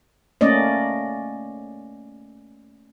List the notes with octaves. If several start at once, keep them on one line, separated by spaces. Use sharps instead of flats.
A3 A#3 C#4 D5 D#5